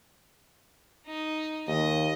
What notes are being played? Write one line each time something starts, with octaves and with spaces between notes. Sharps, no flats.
D#4
D#2 D#5